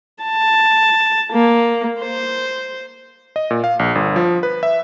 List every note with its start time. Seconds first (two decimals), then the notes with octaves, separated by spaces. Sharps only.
0.24 A5
1.33 A#3
2.01 C5
3.36 D#5
3.51 A#2
3.64 F5
3.79 A#1
3.95 G1
4.16 F3
4.43 B4
4.63 E5